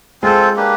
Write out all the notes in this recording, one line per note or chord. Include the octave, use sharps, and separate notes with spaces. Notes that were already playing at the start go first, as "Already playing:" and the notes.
G#3 C4 F4 A4 C5
A#3 D4 G4 B4